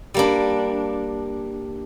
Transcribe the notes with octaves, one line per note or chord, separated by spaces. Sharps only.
G3 A#3 D4